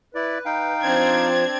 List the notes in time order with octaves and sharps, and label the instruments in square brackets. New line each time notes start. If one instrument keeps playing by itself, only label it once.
[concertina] E4 D5 [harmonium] B4
[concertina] D#4 F5 G5
[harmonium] F3 [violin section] C4 D4 G#6